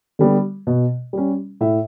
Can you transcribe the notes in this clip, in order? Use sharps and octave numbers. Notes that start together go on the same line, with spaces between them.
D3 G3 B3
B2
G3 C#4
A2 E5